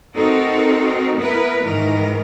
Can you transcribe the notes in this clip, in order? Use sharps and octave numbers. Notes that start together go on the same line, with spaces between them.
C4 D#4 F#4 A4 A#4
B3 E4 A#4 B4
G#2 D#3 E3 A#4